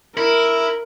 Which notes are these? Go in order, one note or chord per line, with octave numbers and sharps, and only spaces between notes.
E4 A#4